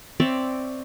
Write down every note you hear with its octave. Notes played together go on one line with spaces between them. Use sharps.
C4 C#5 D5 E5